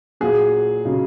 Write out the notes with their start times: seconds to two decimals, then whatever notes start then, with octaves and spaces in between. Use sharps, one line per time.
0.21 A#2 F#3 A#3 F#4 G#4
0.85 C#3 F#3 D#4